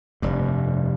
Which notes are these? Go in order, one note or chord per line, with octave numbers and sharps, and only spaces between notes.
F1 G2